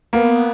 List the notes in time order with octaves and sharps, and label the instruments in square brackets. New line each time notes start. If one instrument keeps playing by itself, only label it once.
[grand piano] A#3 [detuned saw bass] B3